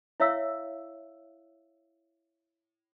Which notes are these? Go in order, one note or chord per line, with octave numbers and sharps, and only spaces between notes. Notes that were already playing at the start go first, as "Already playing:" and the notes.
E4 C#5 E5 F5 E6